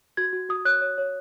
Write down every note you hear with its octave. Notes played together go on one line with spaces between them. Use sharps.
F#4 G#6
F#4
F#4 D#6
C#5 F#6
C#5
C#5